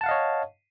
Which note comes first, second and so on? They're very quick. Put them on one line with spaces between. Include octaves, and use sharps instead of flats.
A5 F#5 F5 D#5 C#5